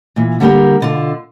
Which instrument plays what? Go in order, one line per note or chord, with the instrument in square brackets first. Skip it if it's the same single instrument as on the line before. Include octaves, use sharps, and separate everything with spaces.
[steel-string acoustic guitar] A#2 E3
D3 G3 A#3 G4 A#4
B2 D3 F4